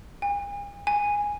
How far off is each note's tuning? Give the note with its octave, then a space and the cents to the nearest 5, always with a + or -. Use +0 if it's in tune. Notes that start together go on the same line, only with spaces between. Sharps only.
G#5 -45
G#5 -10